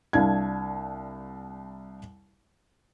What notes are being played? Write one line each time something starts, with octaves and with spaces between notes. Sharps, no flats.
C2 D4 F5 G#6